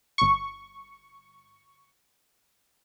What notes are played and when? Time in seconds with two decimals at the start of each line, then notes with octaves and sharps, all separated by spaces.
0.18 G1 C#6